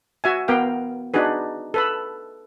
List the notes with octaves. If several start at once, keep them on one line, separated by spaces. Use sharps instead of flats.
F#4 E5 G#5
B3 A#4 F5 G5
D4 D#4 F#4 G#4 B4
A4 B4 B5